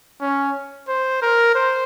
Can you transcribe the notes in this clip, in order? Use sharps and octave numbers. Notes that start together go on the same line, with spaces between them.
C#4
C5
A#4
C5